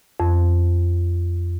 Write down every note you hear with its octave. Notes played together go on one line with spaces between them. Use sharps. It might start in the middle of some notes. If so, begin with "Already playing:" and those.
F2